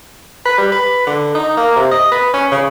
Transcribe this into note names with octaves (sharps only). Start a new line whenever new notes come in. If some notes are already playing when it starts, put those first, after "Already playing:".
B4
G3
B4
D3
D#4
A#3
C3
D#5
B4
C#4
C#3